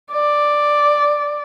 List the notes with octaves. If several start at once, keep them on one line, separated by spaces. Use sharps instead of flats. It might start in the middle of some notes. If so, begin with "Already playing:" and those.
D5